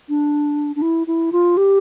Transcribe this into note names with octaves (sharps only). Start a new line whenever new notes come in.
D4
D4
E4
E4
F4
G4